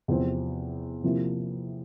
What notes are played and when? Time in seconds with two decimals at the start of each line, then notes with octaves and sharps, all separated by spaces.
0.08 E2 C3 F3 C4
1.03 C3 F3 A#3 E4